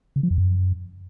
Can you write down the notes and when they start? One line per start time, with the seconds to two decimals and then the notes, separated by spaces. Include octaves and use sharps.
0.16 C#3
0.23 F3
0.31 F2
0.38 F#2